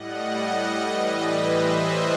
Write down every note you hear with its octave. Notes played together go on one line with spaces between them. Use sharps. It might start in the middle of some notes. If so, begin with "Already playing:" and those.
Already playing: A2 G3 D#5 F#5
A2 E3 G3 B4 D#5
C5 E5